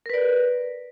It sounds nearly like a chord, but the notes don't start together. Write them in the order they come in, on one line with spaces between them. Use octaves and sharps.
A#4 B4 D5